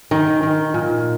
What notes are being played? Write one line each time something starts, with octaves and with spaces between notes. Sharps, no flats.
D#3
D#3
A#2